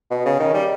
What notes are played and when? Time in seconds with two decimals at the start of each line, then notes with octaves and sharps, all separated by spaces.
0.11 B2
0.26 C#3
0.40 D#3
0.55 G3